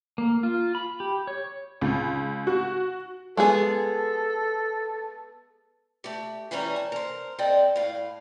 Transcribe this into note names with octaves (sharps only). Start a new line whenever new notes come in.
A#3
F4
B5
G4
C#5
C#2
F#4
G#3 B3 G#4 A4
A3 G4
C#3 E3 G3 C#4 C#5 A#5
A5
A#4 C5
C4 A4 D5 D#5 G5
A2 F5